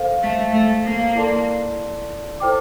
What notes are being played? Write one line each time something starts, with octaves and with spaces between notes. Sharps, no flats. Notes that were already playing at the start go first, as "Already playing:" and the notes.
Already playing: A4 C5 F5
A3
A3
A#3
E4 A4 D5 A5 C6
E4 A4 C5 G5 D6